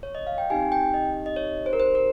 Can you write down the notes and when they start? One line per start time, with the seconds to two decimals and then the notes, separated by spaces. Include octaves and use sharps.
0.03 C#5
0.15 D#5
0.27 F5
0.38 G5
0.50 C4 D#4 G4 G#5
0.72 G5
0.94 D#5
1.26 D#5
1.36 C#5
1.66 C5
1.73 A#4
1.80 C5
1.95 A#4